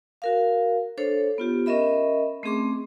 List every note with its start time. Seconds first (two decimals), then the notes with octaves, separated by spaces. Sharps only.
0.22 F#4 A#4 F5
0.98 D4 A4 C5 C#5
1.38 B3 F4 G4
1.66 C#4 A#4 D#5 E5 B5
2.43 A3 C4 C#4 G#4 C6 D6